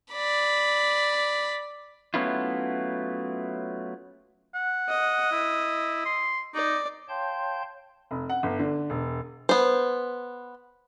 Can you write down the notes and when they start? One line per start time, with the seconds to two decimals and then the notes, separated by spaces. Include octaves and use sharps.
0.11 D5 B5
2.14 F#3 A3 B3 C#4 E4 F4
4.54 F#5
4.89 D#5
5.32 E4
6.06 C6
6.54 D#4 D5
7.09 C#5 F5 G5 A5 C6 G6
8.11 F1
8.29 F#5
8.43 G1
8.59 D3
8.90 E1
9.49 B3 C5